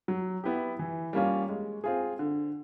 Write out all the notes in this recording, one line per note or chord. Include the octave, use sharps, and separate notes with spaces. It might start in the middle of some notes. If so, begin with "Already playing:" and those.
F#3
B3 E4 G4
E3
G3 A#3 C#4 F4
G#3
C4 F4 G#4
D3